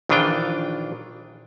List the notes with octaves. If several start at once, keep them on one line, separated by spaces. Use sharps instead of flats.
A#1 D#3 E3 D4 F4 G5